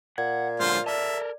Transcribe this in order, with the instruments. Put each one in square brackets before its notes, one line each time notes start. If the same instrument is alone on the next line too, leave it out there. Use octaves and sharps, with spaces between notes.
[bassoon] A#2 [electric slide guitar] F#5 [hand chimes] G#6
[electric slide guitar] G#2 D3 F#3 [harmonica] F4 C5 F5
[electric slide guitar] A4 A#4 A5 [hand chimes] D5 [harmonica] E5